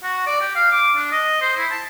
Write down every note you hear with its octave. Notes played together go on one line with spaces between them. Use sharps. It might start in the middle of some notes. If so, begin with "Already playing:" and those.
F#4
D5
G4
F5
D6
D4
D#5
C5
E4
A5